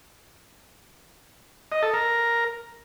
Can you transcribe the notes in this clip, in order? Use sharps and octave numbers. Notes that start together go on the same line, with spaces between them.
D#5
A4
A#4